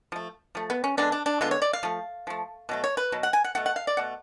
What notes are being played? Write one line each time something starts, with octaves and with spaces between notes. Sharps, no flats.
F3 A3
F3 A3
B3
C#4
D3 G#3 B3 D4
D4
D4
D3 G#3 B3 F4
C#5
D5
F5
F3 A3
F3 A3
B2 F#3 A3
C#5
B4
B2 F#3
F#5
G#5
F#5
B2 A3 F#5
F#5
F5
D5
B2 A3 F#5